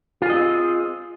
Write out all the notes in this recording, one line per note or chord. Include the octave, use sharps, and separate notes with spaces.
C4 F4 G#4 D#5